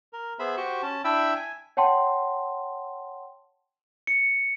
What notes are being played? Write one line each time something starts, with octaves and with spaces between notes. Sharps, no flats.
A#4
B3 G#4 C5 E5 B5
F#4 G4 C5 C#6
C#4 A5
D4 E4 E5 G5 B5 E6
G#5
C#5 F#5 G5 A5 C6
C#7